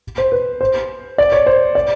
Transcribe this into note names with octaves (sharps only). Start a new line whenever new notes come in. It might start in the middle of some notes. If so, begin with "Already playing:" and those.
C5
B4
C5
D5
C#5
C5
D5